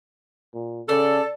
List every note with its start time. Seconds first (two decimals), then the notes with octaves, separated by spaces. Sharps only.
0.54 A#2
0.89 C#3 A4 D5